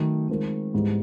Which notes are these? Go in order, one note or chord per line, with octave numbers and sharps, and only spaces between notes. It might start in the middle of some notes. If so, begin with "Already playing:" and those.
Already playing: D#3 F#3 A3
D#3 G#3 C4 F4 A#4
G#2 E3 G3 B3